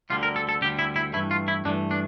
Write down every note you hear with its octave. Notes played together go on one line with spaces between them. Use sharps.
D2 D3 G3 F4
A#4
A4
A4
D2 D3 G3 G4
E4
E4
G2 E3 A3 E4
F4
E4
G2 E3 A3 D4
D4